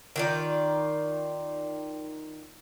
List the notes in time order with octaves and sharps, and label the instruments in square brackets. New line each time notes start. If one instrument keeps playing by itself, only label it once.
[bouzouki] D#3 F4 D5